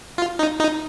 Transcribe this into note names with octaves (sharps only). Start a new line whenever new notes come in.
F4
D#4
D#4